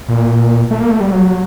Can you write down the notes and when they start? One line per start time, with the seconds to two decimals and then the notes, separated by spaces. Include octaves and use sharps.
0.09 A#2
0.71 A3
0.80 A#3
0.91 A3
1.01 G3
1.11 F#3